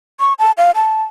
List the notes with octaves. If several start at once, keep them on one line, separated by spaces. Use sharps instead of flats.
C#6
A5
F5
A5